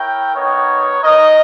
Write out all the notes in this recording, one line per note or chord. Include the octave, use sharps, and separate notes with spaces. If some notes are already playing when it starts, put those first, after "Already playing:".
Already playing: E4 A#4 C#5 G5
B3 D#4 A#4 C#5
D#4 A#4 D#5